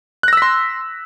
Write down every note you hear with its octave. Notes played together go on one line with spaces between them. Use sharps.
C6 E6 F#6 A#6 B6